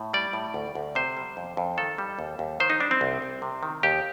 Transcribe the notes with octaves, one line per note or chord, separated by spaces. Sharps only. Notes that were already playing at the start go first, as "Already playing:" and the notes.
Already playing: A2
G3 D5
A2
D2
D2
C3 C5
G3
F2
F2
D#3 A4
G3
D#2
D#2
D#3 C5
D#4
G3 D4
C4
C2
C2
C3
D#3
D#2 G4